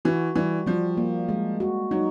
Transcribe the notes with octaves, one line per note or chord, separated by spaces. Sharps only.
E3 F#4
E3 G3
F3 G3
A#3
G#3
F#4
F#3 D#4